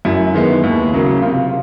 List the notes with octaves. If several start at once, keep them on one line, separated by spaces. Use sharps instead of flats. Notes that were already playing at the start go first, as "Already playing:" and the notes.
F#2 E4
D#3 G#3 B3
D#2
C#3 F#3 A#3
C3 F4